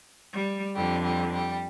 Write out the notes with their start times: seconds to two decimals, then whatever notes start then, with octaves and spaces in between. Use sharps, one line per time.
0.33 G3
0.75 F2 D3 G3
1.03 G3
1.32 G3